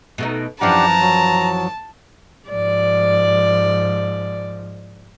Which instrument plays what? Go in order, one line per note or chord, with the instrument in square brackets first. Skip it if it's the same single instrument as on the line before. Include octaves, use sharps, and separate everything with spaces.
[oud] B2 A3 D#4
[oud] F#2 E3 F3 [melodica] D4 G4 F#5 [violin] A5 [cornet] A#5
[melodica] F#3
[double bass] G#2 F3 [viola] D5